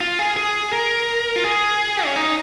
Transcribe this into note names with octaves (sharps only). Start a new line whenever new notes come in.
F4
G#4
G#4
A#4
F4
G#4
C#4
D#4